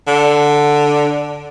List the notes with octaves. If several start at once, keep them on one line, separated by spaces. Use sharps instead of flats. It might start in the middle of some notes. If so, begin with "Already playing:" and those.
D3